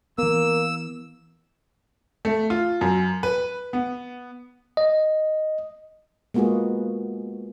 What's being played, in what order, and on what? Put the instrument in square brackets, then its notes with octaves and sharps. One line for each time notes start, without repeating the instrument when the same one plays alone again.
[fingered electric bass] E3 B3 [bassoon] A#3 [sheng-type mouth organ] E6
[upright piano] A3
F4
F#2
B4
B3
[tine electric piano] D#5
[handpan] G#3 A#3 B3 F4 F#4 G#4